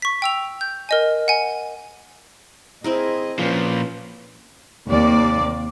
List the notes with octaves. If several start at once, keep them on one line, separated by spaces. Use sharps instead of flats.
C#6 B6
G5 E6 F7
G6
A#4 D#5 G#5
F#5 G#5
C4 E4 G#4 A#4 D#5
A#2 F3 C#4 B4
D#2 C3 A#3 D5